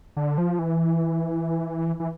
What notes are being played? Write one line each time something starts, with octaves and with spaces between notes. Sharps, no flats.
D3
F3
E3
E3